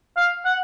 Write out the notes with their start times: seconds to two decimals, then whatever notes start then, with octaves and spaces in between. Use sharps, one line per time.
0.17 F5
0.45 F#5